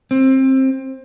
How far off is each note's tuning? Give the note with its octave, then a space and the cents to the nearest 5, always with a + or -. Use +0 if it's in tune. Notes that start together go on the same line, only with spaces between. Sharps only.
C4 +20